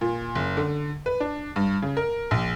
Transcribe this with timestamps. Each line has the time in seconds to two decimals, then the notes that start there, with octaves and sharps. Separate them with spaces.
0.01 A#2
0.35 F#1
0.57 D3
1.06 B4
1.20 D4
1.56 G2
1.82 C#3
1.97 A#4
2.31 A#1